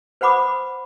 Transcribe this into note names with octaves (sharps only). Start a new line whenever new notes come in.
B4 C5 F#5 B5 D6 D#6